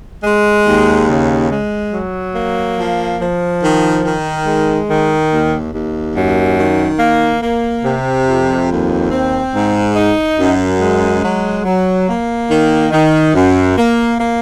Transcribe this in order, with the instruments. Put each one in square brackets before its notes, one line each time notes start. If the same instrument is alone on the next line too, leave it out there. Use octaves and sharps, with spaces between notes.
[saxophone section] G#3
D#2
C#3
G#3
F#3
A#3
F3
F3
D#3
D#3
G#3
D#3
D#2
D#2
F#2
D#3
A#3
A#3
C3
F2
D#2
C4
G#2
D#4
F#2
G#3
F#3
F#3
A#3
D#3
D#3
F#2
A#3
A#3